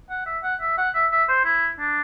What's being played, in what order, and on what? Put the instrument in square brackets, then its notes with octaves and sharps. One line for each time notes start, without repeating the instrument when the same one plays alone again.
[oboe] F#5
E5
F#5
E5
F#5
E5
E5
C5
E4
D4